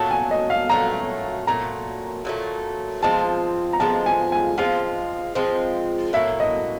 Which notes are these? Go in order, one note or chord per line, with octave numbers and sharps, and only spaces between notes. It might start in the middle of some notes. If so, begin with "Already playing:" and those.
Already playing: A#2 F#3 A3 A5
G#5
D#5
F5
A#2 F#3 A3 A#5
A#2 F#3 A3 A#5
A#2 F#3 A3
F3 G#3 C4 F4 A5
A#5
F3 G#3 C4 F4 A5
G#5
G#5
F3 G#3 C4 F4 F5
F3 G#3 C4 F4
A2 F#3 A#3 E5
D#5